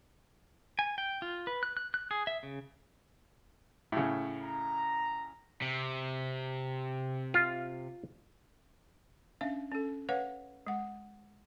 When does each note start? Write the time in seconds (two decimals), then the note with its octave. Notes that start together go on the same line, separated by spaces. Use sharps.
0.79 G#5
0.98 G5
1.22 F4
1.47 B4
1.63 F#6
1.77 F#6
1.94 F#6
2.11 G#4
2.27 E5
2.43 C#3
3.92 A2 C#3
4.43 A#5
5.62 C3
7.34 F4
9.41 C#4 D4 E5 F5
9.71 C#4 A4
10.09 B4 C#5 F5 F#5
10.67 G#3 F#5